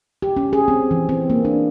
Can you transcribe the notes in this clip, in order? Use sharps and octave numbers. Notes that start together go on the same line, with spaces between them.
G4
C#4
G#4
C4
E3
C4
A#3
D4